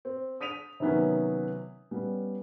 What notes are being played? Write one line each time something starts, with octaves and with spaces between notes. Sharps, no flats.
C4
D#6 B6 D#7 F7
C3 D#3 F#3 B3 C#4
G3 B3 C#4